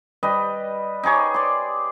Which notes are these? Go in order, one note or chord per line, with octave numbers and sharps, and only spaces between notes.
G3 B4 D#5
D#4 G4 G#4 C#5
D5 C6